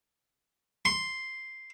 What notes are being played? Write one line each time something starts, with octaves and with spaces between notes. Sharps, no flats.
C6